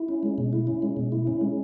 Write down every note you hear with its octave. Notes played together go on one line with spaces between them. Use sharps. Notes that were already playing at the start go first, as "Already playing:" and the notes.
Already playing: E4
C#4
G#3
B2
E4
C#4
G#3
B2
E4
C#4
G#3